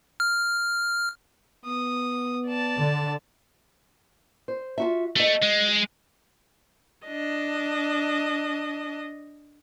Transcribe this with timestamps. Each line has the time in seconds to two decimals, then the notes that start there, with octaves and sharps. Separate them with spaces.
0.20 F6
1.65 B3 D#6
2.47 D5 A5
2.79 D3
4.48 C5
4.78 F4 F#4 E5
5.16 A3 F#4 D#5
5.43 G#3
7.07 D4 D#5